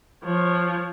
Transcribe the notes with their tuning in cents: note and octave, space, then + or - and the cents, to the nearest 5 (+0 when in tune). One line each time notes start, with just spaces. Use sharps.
F3 +0 C#5 -15